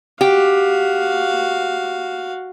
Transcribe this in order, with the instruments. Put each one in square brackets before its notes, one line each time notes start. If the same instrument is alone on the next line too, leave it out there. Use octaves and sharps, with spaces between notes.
[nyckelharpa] F#4 F5 [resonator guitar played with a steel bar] G4